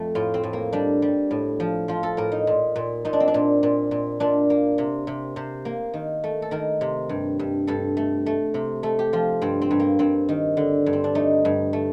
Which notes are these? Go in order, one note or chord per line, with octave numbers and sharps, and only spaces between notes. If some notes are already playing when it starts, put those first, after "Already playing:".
Already playing: F2 A3
A2 F4
C4
A2
A#3
G3 D4
G3
A2
F3
F3 F4
A4
A2 A#4
D#4
A#2
A#2
A#2 D#4
D4
C4
D4
A#2
A#2
A#2
A#2 D4
A#3
C3
C3
C3 C5
A#3
D#3
A3
A4
D#3 A#4
C3
G2
G2
G2 A4
A3
A3
C3
A3 A4
G4
F3 F4
G2 C4
C4
G2
A#3
G2 C4
D#3
D3
G2
C4
D4
A3 D#4
G2
A3